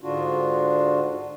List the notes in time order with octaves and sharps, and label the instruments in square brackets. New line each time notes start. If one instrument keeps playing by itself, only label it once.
[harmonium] G#2 D3 D4 F4 F#4